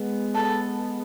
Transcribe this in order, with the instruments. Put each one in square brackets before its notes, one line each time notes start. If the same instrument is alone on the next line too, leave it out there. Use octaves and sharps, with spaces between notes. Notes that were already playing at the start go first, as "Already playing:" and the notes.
Already playing: [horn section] G#3 B3
[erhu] A4